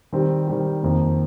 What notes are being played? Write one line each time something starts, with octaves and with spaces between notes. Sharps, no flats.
D#3 G3 C4 G4
D#3 G3 C4 G4
F2 D#3 A#3